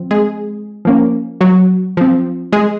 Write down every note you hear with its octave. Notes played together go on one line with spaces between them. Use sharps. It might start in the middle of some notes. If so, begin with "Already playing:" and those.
Already playing: F3 C4
G#3 G#4
F3 A#3 C#4
F#3 F#4
F3 C4
G#3 G#4